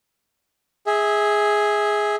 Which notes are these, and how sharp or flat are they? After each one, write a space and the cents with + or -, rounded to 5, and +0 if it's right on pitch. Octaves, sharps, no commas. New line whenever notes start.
G#4 +0 E5 -25